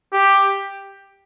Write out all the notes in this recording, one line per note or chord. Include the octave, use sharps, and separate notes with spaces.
G4